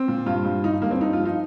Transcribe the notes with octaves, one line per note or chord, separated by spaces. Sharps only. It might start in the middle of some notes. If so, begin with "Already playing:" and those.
Already playing: C4
A#2
G2 F4
G2
G2 D#4
G2 A#3
C4
G2 D#4
F4
F3
D#4